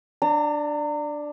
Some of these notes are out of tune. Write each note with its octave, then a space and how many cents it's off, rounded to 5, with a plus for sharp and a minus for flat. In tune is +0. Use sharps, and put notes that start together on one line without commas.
D4 +5 A#5 -35